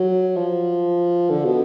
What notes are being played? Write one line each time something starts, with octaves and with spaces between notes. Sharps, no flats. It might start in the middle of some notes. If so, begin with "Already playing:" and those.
Already playing: F#3
F3
D3
B2